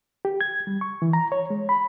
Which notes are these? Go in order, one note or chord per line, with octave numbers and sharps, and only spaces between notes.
G4
G#6
G3
C#6
E3
A#5
C#5
G#3
B5